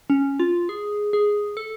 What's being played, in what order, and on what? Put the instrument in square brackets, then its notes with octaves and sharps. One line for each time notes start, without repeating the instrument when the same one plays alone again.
[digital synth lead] C#4
F4
G#4
G#4
A4